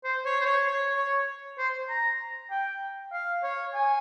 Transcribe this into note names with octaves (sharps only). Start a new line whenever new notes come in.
C5
C#5
C5
C#5
C#5
C#5
C5
A#5
G5
F5
C#5
G#5